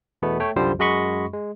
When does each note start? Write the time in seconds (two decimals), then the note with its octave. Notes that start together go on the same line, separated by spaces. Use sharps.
0.22 E2 B2 A3 B3
0.40 A3 C#5 G5
0.56 C2 F#2 D3 F3 G3 C5
0.79 F#2 G#3 F#4 D#5 B5 C#6
1.33 G#3